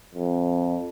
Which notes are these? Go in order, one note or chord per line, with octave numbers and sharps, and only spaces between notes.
F2